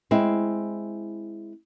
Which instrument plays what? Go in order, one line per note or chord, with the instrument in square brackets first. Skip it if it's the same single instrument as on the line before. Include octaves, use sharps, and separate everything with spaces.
[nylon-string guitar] G#3 C4 E4